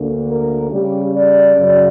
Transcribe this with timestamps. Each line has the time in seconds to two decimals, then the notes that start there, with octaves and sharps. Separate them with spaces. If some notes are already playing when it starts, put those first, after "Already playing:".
Already playing: D2 D3 A#3
0.29 A#4
0.71 C#3 G3 C#4 G4
1.13 D5
1.55 F#2 C#3 F#3